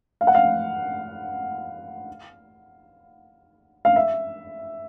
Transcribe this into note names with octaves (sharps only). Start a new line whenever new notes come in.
F5
F#5
F5
F5
E5